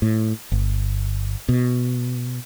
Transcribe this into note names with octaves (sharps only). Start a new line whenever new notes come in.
A2
G1
B2